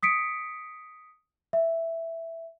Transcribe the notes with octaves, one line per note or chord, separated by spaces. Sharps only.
D#6 B6 C#7 D7
E5